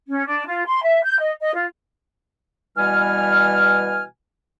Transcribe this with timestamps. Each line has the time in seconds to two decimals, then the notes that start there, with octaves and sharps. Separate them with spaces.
0.09 C#4
0.26 D4
0.47 F4
0.66 C6
0.83 E5
1.03 G6
1.19 D#5
1.40 D#5
1.55 F4
2.77 B2 E3 G3 G#5 F6